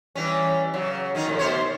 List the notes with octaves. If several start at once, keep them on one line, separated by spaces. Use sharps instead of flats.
E3 G3 C#4
C#3 F#3
D#3 C#4 D#4
A2 C3 F3
B2 C5 C#5